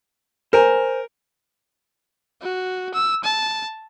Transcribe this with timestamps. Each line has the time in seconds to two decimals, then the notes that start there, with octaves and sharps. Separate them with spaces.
0.53 A#4 C5 G#5
2.42 F#4
2.94 E6
3.24 A5